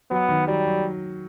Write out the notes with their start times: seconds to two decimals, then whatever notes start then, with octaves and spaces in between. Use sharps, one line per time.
0.11 F#3 B3
0.29 D#3
0.48 F#3 G3
0.67 F#3